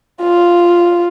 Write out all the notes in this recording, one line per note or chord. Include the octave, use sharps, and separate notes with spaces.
F4